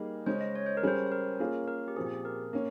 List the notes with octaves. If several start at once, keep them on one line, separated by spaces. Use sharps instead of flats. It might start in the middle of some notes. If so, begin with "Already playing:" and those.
Already playing: G3 A#3 D#4 G#4 A#4
C#3 G#3 C#4 C5
D#5
C#5
C5
A#4
G3 C#4 G#4 C5
C5
A#4
A#3 C#4 F4 G#4
A#4
G4
A#2 F3 C4 G#4
G4
G#4
A#4
A#3 C#4